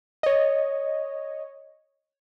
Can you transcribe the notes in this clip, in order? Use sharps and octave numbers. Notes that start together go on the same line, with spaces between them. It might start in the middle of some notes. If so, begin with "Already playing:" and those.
C#5 D#5